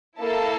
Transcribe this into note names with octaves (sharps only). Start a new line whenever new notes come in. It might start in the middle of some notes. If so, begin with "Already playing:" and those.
A#3 E4 A4 A5